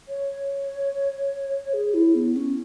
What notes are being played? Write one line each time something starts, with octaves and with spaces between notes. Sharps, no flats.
C#5
G#4
E4
B3
C#4